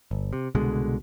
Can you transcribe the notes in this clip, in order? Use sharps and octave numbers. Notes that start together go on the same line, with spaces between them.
G1
C3
C2 B2 D3 G#3